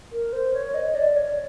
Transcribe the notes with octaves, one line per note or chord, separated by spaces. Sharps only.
A#4
C5
C#5
D#5
D5
C#5